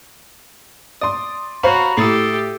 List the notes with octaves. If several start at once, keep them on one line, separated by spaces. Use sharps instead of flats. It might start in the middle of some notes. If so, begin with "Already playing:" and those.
D5 C6 D#6
F#4 C5 C#5 F5 A#5 B5
A2 G4 A4 D#6 A6 C7